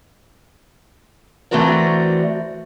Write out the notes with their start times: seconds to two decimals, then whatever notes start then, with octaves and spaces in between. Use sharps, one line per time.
1.51 E3 A3 C4 F#4 A#4 D5